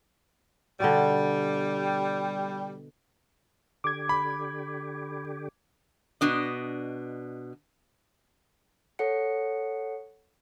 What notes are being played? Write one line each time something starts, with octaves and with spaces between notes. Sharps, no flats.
B2 D3 G3
D3 G4 D6 G#6
B5
B2 D4 D#5
A4 C#5 F#5 C#7